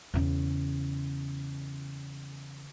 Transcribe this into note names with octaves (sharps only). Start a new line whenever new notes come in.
E2 C#3